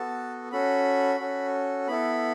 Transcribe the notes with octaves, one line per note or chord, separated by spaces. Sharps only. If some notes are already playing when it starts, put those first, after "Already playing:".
Already playing: B3 F#4 A4 A5
C#4 F#4 A4 B5
C#4 F#4 A4
B3 E4 A4 B5